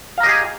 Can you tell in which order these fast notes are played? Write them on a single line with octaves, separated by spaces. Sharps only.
F5 A#5 D#5 G4 G#4